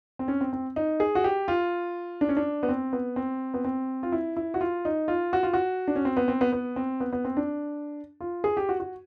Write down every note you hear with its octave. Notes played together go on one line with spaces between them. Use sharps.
C4
C#4
C4
C4
D#4
G#4
F#4
G4
F4
D4
C#4
D4
B3
C4
B3
C4
B3
C4
F4
E4
E4
F#4
F4
D#4
F4
F#4
F4
F#4
D4
C#4
C4
B3
C4
B3
B3
C4
B3
B3
C4
D4
F4
G#4
G4
F#4
F#4